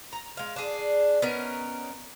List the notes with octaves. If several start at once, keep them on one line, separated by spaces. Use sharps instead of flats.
A#5
G#3 F5
D4 G#4
B3 C#4 D#4 A#4